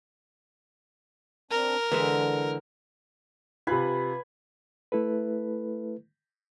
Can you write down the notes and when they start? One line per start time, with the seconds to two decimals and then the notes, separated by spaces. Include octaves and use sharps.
1.51 C4 D4 A#4
1.92 D3 E3 G#3 E5
3.67 C3 F4 B4 G#5
4.92 A3 E4 A4 B4